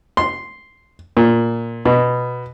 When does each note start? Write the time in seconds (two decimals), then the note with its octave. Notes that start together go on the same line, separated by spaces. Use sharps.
0.17 C6
1.17 A#2
1.85 B2